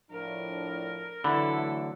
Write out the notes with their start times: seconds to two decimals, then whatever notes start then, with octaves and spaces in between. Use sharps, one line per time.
0.11 A2 F3 D4 A#4
1.24 D3 E3 F#3 A3 E4 A4 B5